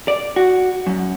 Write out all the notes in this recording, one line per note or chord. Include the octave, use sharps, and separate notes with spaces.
D5
F#4
F#2